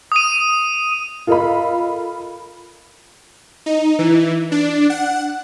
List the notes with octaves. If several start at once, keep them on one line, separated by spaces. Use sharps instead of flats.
D#6 D#7
F4 A4 A#4 D#5 F5 B5
D#4
E3
D4
F#5